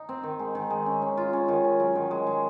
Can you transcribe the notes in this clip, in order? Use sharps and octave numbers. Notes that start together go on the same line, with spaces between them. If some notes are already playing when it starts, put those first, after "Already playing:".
Already playing: D#4
C4
D#3
G#3
D#3
G#3
C#4
C#4
F4
C#4
D#3
C#4
F#3
D#3
G#3
G#3